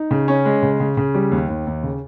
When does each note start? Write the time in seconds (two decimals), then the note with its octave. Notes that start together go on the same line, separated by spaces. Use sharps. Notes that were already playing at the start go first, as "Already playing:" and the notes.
Already playing: D#4
0.11 C#3
0.28 C#4
0.45 G#3
0.63 C#3
0.80 C#3
0.97 C#3
1.14 G3
1.31 D#2
1.48 D#2
1.67 D#2
1.83 C#3